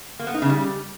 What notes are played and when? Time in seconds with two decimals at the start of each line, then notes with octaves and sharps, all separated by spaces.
0.19 A#3
0.27 B3
0.34 D#4
0.42 C#3
0.49 G3